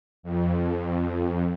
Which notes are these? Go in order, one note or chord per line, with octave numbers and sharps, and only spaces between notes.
F2